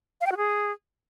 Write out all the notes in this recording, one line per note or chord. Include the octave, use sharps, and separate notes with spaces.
F5
G5
F#4
G#4